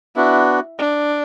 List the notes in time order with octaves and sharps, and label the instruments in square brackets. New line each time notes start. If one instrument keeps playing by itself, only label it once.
[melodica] B3 D4 F#4 [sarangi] E4
[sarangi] D4